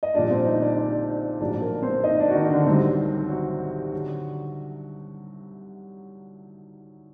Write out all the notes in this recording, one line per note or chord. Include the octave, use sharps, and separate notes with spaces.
D#5
A#1 A#2 G3 D4 D5
C4 C5
D#4 D#5
D4 D5
D4 D5
A#1 A2 F#3 D4 D5
A#3 A#4
C4 C5
D#4 D#5
D4 D5
F#4
D#3 D#4
D3 D4
C2 C3 D#3 F#3 C4
F#3 F#4
D3 F#3